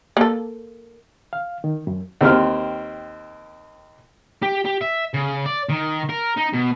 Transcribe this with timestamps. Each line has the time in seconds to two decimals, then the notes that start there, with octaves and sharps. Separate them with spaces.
0.17 A#3 A4
1.33 F5
1.64 D#3
1.87 F#2
2.21 D#2 C4 F6
4.43 G4
4.66 G4
4.81 E5
5.14 C#3
5.46 D5
5.69 D#3
6.09 A#4
6.37 D#4
6.53 B2